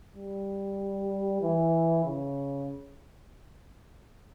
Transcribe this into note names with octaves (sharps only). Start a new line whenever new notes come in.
G3
E3
C#3